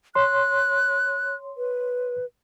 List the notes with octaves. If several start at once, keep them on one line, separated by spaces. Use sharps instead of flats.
C#5 C6 F#6
B4